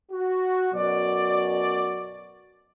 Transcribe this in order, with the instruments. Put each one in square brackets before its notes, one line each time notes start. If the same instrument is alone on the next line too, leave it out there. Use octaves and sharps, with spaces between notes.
[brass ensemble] F#4
F#2 B2 F#3 F#4 D5